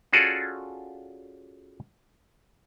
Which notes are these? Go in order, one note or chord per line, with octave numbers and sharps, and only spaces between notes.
C#4 F4 F#4 G#4 A4 D5